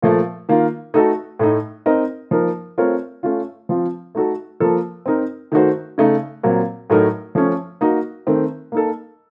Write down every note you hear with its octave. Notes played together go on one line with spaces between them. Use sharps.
A#2 F3 A3
D#3 A#3 F4
A3 D#4 F#4 A4
A2 A3 D#4
C4 D#4 A#4 D#5
F3 A#3 D#4 A#4
A3 C4 F4 A#4 C#5
A3 C#4 F4
F3 C4 F4
A3 D#4 F#4 A4
F3 A#3 F4 A4
C4 D#4 A#4
D#3 A3 D#4 F#4 C5
C#3 A3 D#4
A#2 F#3 C4
A2 F#3 A3 D#4 A#4
F3 A3 C#4
A#3 D#4 F#4
D#3 A3 C4
A#3 D#4 A4